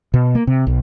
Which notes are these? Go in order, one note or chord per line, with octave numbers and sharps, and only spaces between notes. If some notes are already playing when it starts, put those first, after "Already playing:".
B2
A#3
C3
B1